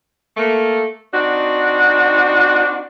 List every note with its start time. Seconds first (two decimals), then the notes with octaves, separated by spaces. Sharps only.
0.37 A3 A#3
1.13 C4 D4 D#4 F#4